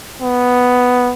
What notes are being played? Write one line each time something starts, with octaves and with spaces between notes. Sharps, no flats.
B3